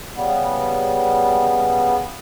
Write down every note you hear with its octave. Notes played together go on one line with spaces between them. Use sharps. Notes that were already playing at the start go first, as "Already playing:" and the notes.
C#3 G3 B3